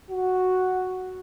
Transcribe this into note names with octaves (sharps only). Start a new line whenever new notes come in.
F#4